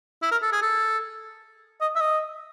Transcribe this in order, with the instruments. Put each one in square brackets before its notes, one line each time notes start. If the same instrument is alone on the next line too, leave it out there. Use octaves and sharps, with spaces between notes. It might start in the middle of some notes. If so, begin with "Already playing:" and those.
[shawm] E4
A#4
A4
G#4
A4
D#5
E5
D#5